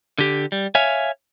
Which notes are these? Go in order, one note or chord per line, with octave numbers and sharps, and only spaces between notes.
D3 G4
G3
C#5 E5 F5 G#5